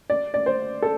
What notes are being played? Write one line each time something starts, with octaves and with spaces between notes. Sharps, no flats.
D5
D5
C5
A4